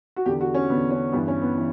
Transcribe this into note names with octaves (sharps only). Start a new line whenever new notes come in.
F#4
E2 D3 G4
F#4
C#4
E2 D3 B3
C#4
G2 E3 B3
C#4
B3
E3